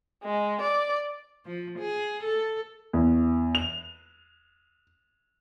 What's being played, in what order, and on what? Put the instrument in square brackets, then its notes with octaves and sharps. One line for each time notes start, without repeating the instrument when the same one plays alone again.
[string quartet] G#3
D5
[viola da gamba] F3
G#4
A4
[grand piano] E2
F7